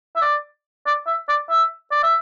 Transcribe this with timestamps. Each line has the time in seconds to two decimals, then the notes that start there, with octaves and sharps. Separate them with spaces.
0.16 E5
0.22 D5
0.86 D5
1.07 E5
1.29 D5
1.50 E5
1.91 D5
2.03 E5